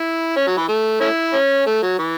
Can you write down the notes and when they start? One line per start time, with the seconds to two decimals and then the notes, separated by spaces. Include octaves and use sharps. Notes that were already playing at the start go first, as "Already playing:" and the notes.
Already playing: E4
0.36 C#4
0.47 F#3
0.57 E3
0.69 A3
1.01 A3 C#4 E4
1.33 C#4
1.66 A3
1.83 F#3
1.99 E3